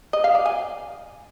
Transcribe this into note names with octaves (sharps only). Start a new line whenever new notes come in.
D#5
F5
D5
G#5